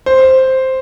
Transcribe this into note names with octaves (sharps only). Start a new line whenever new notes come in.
C5